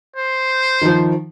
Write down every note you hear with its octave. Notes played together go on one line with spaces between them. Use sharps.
C5
D#3 F3